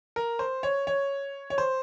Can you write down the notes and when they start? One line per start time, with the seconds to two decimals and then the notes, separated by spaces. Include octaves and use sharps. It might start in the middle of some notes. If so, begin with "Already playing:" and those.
0.16 A#4
0.39 C5
0.63 C#5
0.87 C#5
1.50 C#5
1.58 C5